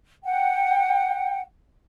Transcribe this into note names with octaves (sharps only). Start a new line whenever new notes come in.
F#5 G5